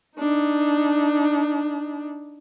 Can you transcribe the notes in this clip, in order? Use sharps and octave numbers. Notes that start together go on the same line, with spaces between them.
D4 D#4